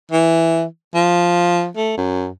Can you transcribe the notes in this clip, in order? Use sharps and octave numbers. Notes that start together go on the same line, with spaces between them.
E3
F3
A3
F#2